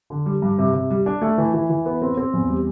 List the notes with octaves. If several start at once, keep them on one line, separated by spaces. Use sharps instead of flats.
D3
G3
G2
C3
C3
G3
D4
A3
E3
E3
E3
B3
C4
C4
E2
G3